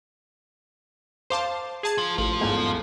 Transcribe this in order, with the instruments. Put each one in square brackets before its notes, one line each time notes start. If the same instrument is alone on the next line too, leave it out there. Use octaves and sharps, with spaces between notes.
[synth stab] C5 F5 A5 [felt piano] C6 D6
[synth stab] G#4 A5 G#6
[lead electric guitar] F3
[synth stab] A1 [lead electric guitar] F3
[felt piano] G1 E2 G#2